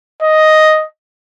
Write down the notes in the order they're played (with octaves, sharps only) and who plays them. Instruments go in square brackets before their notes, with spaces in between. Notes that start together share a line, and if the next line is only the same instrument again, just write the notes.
[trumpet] D#5